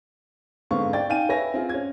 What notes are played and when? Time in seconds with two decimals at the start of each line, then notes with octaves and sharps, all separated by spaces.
0.71 G#2 D3 B3 C4 F5 C#6
0.93 D5 G5 A6
1.09 D#4 F5 G5 G#5 D#7
1.29 B4 C#5 E5 G#5 A#6
1.54 C4 F4 G#4
1.69 C#4 G#6